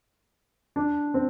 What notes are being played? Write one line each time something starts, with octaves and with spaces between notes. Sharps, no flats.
D4
C4